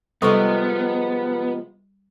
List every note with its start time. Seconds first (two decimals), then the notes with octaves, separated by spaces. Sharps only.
0.22 C3 F3 G3 G#3 B3 A4 C#6